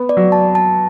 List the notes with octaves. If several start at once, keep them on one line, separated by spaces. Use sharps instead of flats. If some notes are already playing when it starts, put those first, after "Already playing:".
Already playing: B3
D5
F#3
A5
A5